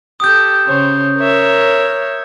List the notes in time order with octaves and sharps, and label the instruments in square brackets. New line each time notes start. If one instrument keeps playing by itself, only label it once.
[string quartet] G4 A4 [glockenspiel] D#6 G6
[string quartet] C#3 C5 C#5
A#4 C#5 E5